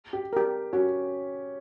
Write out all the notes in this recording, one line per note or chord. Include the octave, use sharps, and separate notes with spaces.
G4
G4 A#4
C#4 F#4